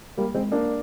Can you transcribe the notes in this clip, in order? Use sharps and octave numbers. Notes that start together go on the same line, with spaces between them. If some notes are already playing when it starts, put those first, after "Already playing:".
G3 A#3
G#3 C4
A#3 D4